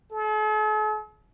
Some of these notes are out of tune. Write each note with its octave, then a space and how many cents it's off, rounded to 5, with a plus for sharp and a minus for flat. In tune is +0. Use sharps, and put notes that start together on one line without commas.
A4 -45